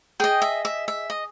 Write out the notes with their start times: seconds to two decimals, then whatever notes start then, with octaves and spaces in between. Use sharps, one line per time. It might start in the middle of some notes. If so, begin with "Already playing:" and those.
0.20 G#4 D#5 G5
0.42 E5
0.65 E5
0.88 E5
1.10 D#5